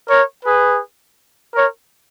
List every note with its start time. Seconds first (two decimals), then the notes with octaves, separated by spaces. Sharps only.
0.08 A#4 C#5
0.45 G#4 B4
1.54 A#4 C#5